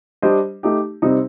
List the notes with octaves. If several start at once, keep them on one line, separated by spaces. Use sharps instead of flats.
G3 D4 G4 C5 D#5
A3 D#4 G4
C3 G3 C4 D#4